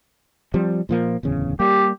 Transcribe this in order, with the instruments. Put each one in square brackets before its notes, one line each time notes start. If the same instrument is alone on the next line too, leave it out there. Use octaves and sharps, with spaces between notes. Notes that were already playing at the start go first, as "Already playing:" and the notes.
[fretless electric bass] F3 G3 C4
A#2 F3 A#3
D1 E2 C#3
[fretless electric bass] G3 A#3 [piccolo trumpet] G4